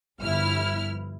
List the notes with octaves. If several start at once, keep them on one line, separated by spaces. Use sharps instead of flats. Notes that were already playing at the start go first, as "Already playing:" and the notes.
G1 F3 E4 F6